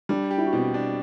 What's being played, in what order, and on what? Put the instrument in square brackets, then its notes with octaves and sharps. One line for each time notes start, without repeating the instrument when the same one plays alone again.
[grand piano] G3 [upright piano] D4
[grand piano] G4
[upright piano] E4
F#4
[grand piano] B2 [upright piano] C4 E4
[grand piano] D4